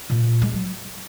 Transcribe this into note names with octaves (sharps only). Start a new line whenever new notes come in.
A#2
G#3
F#3